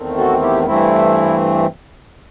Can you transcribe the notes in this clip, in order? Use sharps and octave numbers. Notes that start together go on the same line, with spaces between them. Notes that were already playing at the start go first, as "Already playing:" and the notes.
Already playing: E2 D#3 A3 C4
F#4 A4
E4 G4
G2 E3 A3 C4 E4